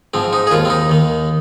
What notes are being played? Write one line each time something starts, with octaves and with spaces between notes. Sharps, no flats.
G#2 F3 C4
D#4
G#4
D#2 D#3 F4
C4
D#4
D#2 D#3